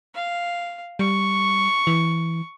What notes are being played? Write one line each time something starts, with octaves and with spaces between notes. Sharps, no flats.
F5
G3 C#6
E3